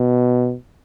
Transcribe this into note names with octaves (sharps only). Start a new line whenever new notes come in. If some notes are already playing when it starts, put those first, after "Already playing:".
Already playing: B2